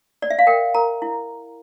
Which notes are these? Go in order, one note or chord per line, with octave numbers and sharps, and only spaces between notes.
D5
E5
F5
A#4 G5
A#4 A#5
E4